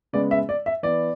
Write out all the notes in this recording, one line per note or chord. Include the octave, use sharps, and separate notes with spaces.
C#3 G#3 B3 D5
E5
D5
E5
E3 B3 D5